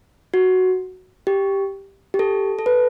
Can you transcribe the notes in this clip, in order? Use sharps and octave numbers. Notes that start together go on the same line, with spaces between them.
F#4
G4
G4
A4
A4
B4